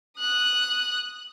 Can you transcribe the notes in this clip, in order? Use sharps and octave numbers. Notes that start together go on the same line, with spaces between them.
D#6 F#6